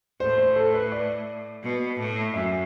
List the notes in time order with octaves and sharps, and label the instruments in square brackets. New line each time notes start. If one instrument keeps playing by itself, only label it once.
[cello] A2 [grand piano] C5
[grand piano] C5
A4
B4
D5
[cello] B2
A2
[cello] F#2 [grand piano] E5